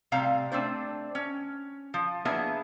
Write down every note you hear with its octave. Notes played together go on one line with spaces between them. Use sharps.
A2 C3 G3 F5 A#5
A3 C4 D4 C5
C#4
F3
A#3 B3 D4 E4 G#4 E5